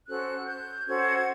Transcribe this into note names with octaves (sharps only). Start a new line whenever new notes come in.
C#4 F#4 A4 C5 F#6
G6
C#4 F#4 A4 C5 G#6